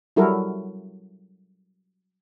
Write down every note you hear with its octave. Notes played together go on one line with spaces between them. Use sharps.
F#3 G3 E4 F#4 A4 A#4